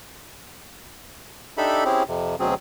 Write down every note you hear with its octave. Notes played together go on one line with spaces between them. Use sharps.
D4 D#4 G4 A4 E5 B5
C4 C#4 E4 G4 G#4
F2 C3
D2 B2 F#3 C4 C#4 G#4